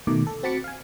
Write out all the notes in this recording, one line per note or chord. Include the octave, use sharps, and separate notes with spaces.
B2 D#3 A3 D#4 D6
A4
C4 F#4 A5 B5 D6 C#7
F5 G#5